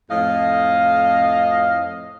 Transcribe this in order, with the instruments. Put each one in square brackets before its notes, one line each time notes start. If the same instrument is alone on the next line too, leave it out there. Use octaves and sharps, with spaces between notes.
[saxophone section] F2 A2 D#5 F5